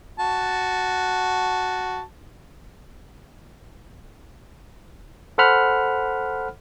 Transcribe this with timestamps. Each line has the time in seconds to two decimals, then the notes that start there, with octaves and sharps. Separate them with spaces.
0.19 F#4 A5
5.38 A4 C5 F#5 B5 F6